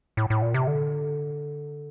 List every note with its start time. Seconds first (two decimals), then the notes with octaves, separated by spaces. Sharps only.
0.17 A2
0.30 A2
0.42 A#2
0.54 C3
0.67 D3